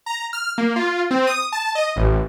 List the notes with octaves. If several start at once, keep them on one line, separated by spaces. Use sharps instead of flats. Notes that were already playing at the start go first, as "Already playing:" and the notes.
A#5
F6
A#3
F4
C4
D#6
A5
D#5
A1